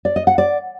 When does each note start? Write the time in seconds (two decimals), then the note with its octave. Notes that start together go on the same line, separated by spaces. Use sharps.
0.05 D5
0.16 D#5
0.27 F#5
0.38 D5